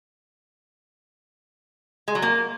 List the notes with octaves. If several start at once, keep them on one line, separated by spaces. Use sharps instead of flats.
G#3
F#3
A#3